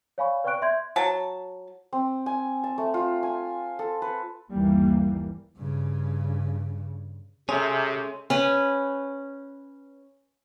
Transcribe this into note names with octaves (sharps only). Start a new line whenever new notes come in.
C#5 D5 F5 G#5 B5 C#6
B4 D5 G5 C#6 F#6 D7
E5 C6 G6 G#6
F#3 A5
C4
G#5
A5
A3
F4
G#5
A4
B4
G1 D#2 E3 G3 A#3
G2 C#3
C3 G#3 A3 C#4
C#4 B4